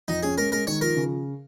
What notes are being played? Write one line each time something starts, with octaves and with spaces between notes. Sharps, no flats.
F2 D#4
C#4 G#4
G#3 A#4
G#3 A#4
D#3 C#5
F3 A#4
C#3